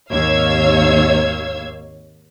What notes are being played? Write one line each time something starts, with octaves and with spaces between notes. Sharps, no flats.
G#1 D#2 C#5 F5 E6 G#6